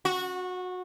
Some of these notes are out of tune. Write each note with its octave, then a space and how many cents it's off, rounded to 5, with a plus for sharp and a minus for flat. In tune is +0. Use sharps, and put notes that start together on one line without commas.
F#4 -20